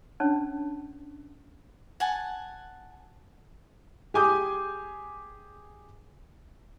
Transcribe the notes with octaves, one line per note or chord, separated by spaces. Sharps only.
C#4 D4 C#5 A5
F#5 G#5 A5
G4 G#4 G#5 D6 D#6 G6